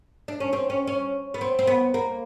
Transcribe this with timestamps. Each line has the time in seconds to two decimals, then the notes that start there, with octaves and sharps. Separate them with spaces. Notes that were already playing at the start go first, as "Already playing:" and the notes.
0.28 D4
0.40 C#4
0.53 C4
0.70 C#4
0.87 C#4
1.34 B3
1.41 C4
1.59 C4
1.67 B3
1.94 A#3